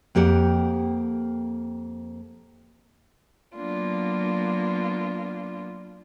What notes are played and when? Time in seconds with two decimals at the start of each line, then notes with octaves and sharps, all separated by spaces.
0.15 F2 A#3 G4 F#5
3.55 F#3 A#3 B3 D4 F4